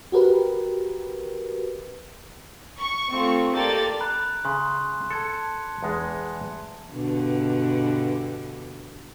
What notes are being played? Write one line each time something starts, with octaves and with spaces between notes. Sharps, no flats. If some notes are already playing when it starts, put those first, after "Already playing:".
F#4 G4 A#4 B4
C#6
A3 C4 F4
A#3 G4 A4 D5 A6
A#5 B5 F#6
C#3 C6
A4 A5 G#6 C#7
E2 G#3 D4
G2 B2 D3